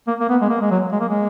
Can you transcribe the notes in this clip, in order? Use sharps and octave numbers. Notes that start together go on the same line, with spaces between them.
A#3
A#3
B3
G#3
A#3
G#3
F#3
G#3
A#3
G#3